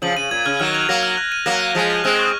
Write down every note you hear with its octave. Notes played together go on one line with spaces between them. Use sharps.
C#3 F3 F#7
C#3 D#7
A#2 G#6
C#3 F6
D#3 F#3 F6
F7
F#3 A#3 A#6
F6
F#6
D#7
F#3 A#3 A#6
F#6
F3 G#3 F7
A#6
G#3 C4 F6
C#6